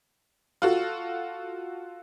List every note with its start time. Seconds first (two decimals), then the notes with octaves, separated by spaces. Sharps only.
0.62 F4 F#4 A4